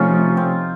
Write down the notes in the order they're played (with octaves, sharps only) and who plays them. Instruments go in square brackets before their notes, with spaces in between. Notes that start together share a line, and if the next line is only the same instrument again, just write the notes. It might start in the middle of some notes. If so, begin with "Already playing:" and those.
Already playing: [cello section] C3 F3 A3 [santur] C#4 D#4 F4
[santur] C4